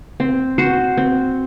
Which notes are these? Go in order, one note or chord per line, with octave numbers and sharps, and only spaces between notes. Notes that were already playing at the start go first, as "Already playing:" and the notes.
C4
F#4 C5
C4